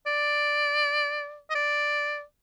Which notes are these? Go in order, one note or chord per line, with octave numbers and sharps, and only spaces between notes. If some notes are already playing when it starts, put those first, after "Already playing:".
D5
D#5
D5